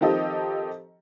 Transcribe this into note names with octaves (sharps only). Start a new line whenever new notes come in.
D#3 F3 C4 G4 A4 D#5